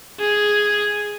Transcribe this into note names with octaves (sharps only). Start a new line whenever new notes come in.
G#4